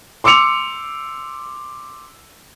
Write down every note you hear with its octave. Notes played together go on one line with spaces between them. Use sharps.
C6 D6 E6 C#7 F7